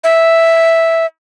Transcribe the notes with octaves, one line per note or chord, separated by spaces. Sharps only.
E5